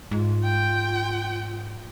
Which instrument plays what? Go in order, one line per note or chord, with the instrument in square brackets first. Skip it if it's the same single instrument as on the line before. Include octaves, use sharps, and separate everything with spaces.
[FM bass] G#2 [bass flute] F4
[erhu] G5